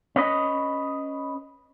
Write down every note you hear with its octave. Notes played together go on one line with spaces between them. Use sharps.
C#4 B4 D#5